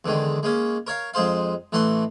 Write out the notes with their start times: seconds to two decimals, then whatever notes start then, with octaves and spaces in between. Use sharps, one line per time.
0.05 E2 D3 D#3 G#3
0.43 G#3 A#3 C#4
0.87 A#4 C#5 F5
1.14 F2 G#3 G#4 C5 F5
1.72 A1 E3 A3 F#5 C6